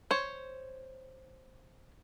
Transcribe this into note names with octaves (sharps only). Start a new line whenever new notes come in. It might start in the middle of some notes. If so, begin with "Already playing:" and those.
C5 C#5